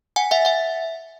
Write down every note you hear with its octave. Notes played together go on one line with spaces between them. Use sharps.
F#5 G#5
E5 F#5
E5 F#5